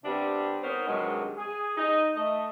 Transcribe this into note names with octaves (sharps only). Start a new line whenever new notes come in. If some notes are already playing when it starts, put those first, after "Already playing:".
C3 G3 B3 C4 D4
B3 D#4 G#4 A#4 C5 C#5
G2 C3 D#3 F#3 G#3
G#4
D#4
A3 D#5